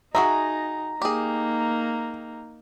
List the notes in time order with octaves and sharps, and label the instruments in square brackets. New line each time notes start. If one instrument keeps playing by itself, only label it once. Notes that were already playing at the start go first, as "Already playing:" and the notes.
[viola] D#4 [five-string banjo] F#4 G#4 E5 [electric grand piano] A#5
[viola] A#3 D#4 [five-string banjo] G4 G#4